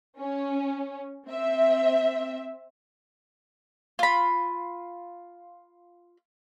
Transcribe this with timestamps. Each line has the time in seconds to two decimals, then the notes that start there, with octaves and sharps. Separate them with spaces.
0.19 C#4
1.27 C4 E5
3.99 F4 B5